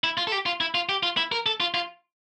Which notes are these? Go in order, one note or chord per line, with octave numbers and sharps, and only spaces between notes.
E4
F4
A4
G4
F4
E4
F4
G4
F4
E4
A#4
A4
F4
F4